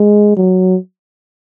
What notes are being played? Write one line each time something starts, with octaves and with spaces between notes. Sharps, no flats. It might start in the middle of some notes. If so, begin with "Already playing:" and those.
Already playing: G#3
F#3